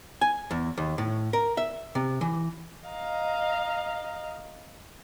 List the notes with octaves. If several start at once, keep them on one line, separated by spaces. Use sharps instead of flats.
G#5
E2
D#2
A2
A#4
E5
C3
E3
D#5 F5 A#5